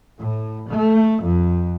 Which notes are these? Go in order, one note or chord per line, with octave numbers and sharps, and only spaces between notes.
A2
A3
F2